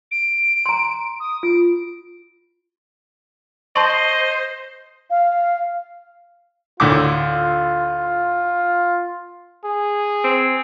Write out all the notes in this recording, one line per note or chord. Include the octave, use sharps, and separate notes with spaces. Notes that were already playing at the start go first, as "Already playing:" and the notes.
D7
A#5 C6
D#6
F4 D7
C5 D#5 A5 C6 C#6
F5
D2 A2 F4 D6
G#4
C4